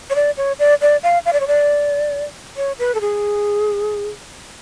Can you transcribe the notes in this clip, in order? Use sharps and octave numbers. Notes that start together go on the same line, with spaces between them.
C#5
D5
C#5
D5
D5
F5
F5
D5
C#5
D5
C#5
B4
A4
G#4